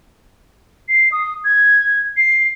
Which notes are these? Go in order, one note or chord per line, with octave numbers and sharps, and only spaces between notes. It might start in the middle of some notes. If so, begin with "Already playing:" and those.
C7
D#6
G#6
C7